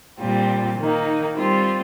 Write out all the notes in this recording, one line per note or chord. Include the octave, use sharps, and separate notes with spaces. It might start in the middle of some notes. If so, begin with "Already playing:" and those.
A#2 G3 C4 F4
D#3 A#3 D#4
G3 C4 F4